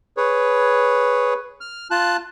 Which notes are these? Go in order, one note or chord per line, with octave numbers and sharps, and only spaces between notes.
G#4 B4 C#5
F6
F4 A5 F#6